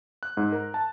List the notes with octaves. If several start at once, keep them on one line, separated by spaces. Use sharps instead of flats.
F#6
G#2
A#4
A5